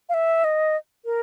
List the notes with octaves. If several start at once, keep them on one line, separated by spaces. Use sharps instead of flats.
F5
E5
D#5
A#4